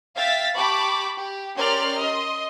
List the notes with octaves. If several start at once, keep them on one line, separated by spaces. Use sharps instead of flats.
E5 F5 G5 A6 B6
G4 A5 B5 C#6 D6
G4
C#4 G4 A#4 D5 C6 F6
D#5 C6